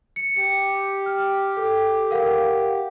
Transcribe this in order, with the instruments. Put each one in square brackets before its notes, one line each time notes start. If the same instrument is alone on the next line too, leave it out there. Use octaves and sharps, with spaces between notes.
[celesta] C#7
[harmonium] G4 [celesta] C#7
[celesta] F6
A4
A#4 F5 F#5